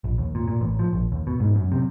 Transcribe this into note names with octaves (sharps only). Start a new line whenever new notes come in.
A#1
D#2
A#2
A#2
A1
F3
A#1
D#2
B2
G#2
F#2
C3